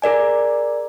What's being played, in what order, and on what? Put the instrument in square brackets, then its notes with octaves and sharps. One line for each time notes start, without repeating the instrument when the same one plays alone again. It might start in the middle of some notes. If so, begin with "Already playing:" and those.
[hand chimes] G#4 A#4 D5 G#5